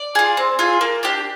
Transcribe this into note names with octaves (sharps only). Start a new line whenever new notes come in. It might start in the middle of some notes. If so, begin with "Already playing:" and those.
Already playing: D5
F4 G#4
C4
F4 G#4
A#3
D4 G4